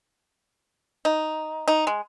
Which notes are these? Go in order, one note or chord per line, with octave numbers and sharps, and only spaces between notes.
D#4
D#4
G#3